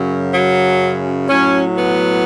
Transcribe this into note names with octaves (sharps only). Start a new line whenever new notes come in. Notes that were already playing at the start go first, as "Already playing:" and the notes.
Already playing: F#2 C#3 F#3
F#3
A2 F#3 C#4
B3